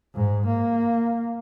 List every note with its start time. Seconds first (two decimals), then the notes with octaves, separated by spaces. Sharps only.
0.15 G#2
0.46 A#3